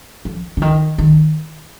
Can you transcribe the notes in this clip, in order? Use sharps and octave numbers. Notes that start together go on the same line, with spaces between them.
F3
D3
D#3
D#3